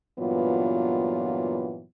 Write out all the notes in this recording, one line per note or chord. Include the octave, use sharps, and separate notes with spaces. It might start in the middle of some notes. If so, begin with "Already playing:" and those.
G2 A#2 E3 F#3 B3 F4